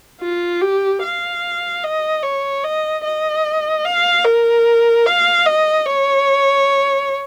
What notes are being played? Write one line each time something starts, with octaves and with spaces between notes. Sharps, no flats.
F4
G4
F5
D#5
C#5
D#5
D#5
F5
A#4
F5
D#5
C#5